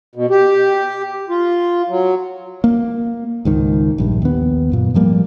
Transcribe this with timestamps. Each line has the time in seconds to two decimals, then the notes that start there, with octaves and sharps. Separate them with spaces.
0.15 B2
0.30 G4
1.29 F4
1.89 F#3
2.64 A#3
3.45 C#2 G#2 D#3
3.98 A#1 G2
4.22 D#2 B3
4.72 F#2 A#2
4.94 G#2 F3 G3 A#3